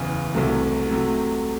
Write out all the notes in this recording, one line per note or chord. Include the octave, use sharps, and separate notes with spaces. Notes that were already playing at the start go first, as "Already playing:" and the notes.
Already playing: F#1 E2 C#3
C2 C3 F#3 A3
C3 F#3 A3